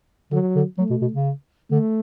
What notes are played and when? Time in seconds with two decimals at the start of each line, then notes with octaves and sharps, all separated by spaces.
0.32 D3 F#3
0.56 D3
0.78 F#3 A3
0.90 B2
1.01 B2
1.13 C#3
1.71 D3 A3